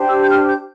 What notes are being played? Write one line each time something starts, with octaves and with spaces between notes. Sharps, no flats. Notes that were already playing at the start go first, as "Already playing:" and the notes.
Already playing: D4 G4 C5
E6
G6
F6
G6